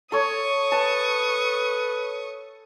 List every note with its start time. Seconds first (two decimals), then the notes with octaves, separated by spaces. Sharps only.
0.12 A4 C#5 C#6 D#6
0.72 B4 A5